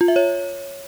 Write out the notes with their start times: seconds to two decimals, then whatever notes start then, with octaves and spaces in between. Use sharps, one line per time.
0.01 F4
0.08 E5
0.16 C#5